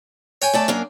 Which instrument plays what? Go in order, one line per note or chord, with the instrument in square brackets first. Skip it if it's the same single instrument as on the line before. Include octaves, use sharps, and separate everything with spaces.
[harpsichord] C#5 G5 G#5
[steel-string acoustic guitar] A3 D5 A5
F#2 A#3 D4